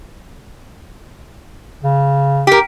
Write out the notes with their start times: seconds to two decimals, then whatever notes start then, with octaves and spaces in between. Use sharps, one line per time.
1.83 C#3
2.47 G4 A#4